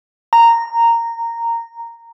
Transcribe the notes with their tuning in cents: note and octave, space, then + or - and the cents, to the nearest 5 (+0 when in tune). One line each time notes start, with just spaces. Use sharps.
A#5 -10